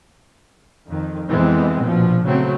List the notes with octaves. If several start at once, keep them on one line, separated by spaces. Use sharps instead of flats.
F2 D#3
F2 E3 G#3 B3 C4
A#1 B2 F3
C#3 F#3 A3 C4